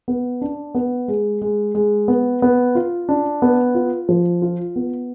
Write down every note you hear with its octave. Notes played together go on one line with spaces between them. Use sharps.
B3
D4
B3
G#3
G#3
G#3
B3
B3
F4
D4
B3
F4
F3
F4
B3